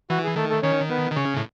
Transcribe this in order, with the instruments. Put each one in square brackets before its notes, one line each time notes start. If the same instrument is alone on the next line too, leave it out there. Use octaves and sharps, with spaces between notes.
[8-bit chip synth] E3 [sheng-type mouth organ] F#4
[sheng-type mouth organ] G#4
[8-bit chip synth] D#3 [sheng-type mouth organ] A3 A4
[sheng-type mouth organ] A3 A4
[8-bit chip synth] D#3 [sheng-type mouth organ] C#4 C#5
[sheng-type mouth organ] B3 B4
[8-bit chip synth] D#3
[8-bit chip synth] C#3 [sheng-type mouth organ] C#4 C#5
[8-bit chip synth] A2